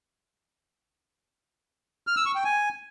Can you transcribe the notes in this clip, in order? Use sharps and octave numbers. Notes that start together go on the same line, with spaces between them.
F6
E6
C#6
G5
G#5